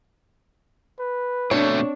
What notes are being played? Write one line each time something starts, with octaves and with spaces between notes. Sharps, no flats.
B4
B2 A3 C4 D4 C#5